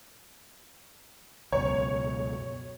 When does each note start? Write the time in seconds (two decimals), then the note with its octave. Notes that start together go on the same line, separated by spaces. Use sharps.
1.52 C#2 F#2 B2 C#5